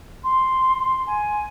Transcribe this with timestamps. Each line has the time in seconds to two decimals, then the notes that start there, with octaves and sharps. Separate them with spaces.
0.23 C6
1.06 G#5